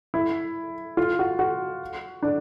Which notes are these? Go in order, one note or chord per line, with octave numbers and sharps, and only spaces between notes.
E4
F4
F#4
F#4
D4